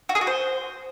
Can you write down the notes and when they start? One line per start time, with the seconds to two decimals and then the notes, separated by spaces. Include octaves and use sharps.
0.09 F#4
0.15 G#4
0.21 F#4
0.27 C5